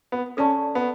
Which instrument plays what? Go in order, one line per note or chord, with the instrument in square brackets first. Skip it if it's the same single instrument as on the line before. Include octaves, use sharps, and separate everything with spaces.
[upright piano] B3
[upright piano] C#4 [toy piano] A4 D5 A5 C#6
[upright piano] B3